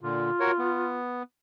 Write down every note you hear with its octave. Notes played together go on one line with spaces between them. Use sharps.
A#2 D3 F4
F#4 A#4 C#5
B3